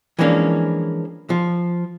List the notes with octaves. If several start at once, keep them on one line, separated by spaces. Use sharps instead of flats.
E3 F3 G#3 A#3 C#4 D4
F3